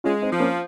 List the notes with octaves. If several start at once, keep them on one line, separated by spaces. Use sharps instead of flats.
G#3 C#4 F4
C4 D#4
F3
A#3 C#4